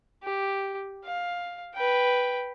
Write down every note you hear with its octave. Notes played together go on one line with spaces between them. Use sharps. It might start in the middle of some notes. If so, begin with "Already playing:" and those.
G4
F5
B4 G5